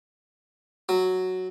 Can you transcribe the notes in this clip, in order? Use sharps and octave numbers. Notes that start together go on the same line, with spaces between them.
F#3